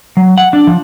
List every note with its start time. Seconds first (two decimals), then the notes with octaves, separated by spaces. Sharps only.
0.17 F#3
0.38 F#5
0.53 D4
0.67 F3